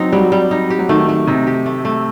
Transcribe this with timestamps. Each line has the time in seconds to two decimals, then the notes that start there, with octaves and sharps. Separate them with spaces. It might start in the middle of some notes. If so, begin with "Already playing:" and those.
Already playing: F#3 C4 D#4
0.12 F#3 G3
0.32 G3
0.51 D#4
0.70 G4
0.79 F#3
0.89 D#3 A3
1.09 A3
1.27 C3 D#4
1.47 G4
1.66 A3
1.85 A3